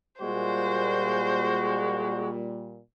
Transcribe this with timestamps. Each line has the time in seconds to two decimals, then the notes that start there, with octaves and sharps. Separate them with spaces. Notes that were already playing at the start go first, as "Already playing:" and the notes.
0.21 A#2 G3 G#3 F#4 C5